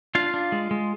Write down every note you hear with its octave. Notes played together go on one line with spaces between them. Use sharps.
D4 F4 F5
D4
G#3
G#3